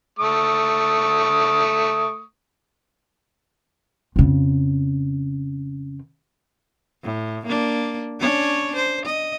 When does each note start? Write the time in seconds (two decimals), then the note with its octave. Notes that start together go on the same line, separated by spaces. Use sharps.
0.19 A3 C#6 D#6
4.16 F2 C#3
7.03 A2
7.46 A#3 D4
8.20 C#4 D4 C#5
8.76 C5
9.05 D#5